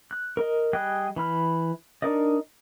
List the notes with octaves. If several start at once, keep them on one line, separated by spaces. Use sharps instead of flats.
F#6
A#4 D#5
G3 G#4 D#5 G5 F#6
E3 B5 F6
D4 D#4 A#4 D5 D#5